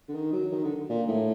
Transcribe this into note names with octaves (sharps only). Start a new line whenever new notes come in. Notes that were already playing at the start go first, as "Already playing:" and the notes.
D3
D#3
F#3
D#3
D3
A#2
A2